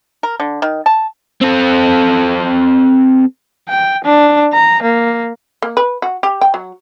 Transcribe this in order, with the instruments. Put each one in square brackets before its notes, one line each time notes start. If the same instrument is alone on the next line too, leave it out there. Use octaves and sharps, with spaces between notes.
[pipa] A#4
D3
D#3
A5
[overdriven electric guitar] C4 A4
[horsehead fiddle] G5
D4
A#5
A#3
[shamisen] A#3
B4
F#4
G4
G5
F#3